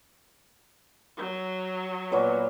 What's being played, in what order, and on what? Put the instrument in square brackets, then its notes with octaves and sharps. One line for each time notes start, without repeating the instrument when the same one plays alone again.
[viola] F#3
[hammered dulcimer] A#2 C#5 [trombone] B3